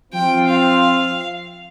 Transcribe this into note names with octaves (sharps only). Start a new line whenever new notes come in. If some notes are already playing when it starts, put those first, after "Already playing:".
F3 C4 F4 G5
F5